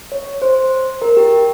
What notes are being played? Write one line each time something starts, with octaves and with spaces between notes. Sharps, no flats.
C#5
C5
A#4
G4